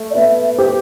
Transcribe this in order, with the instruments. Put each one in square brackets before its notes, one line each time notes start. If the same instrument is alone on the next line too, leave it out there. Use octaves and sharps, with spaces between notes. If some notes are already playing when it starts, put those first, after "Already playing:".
Already playing: [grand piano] A3
[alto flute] D5
[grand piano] B3 [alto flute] E5
[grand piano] G4 [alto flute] C5